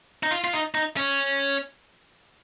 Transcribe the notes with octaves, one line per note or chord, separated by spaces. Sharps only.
D#4
F4
F4
D#4
D#4
C#4